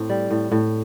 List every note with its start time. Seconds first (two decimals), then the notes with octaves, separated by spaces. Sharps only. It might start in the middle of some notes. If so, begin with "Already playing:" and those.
Already playing: A2 C4
0.09 G3
0.31 A2
0.51 A2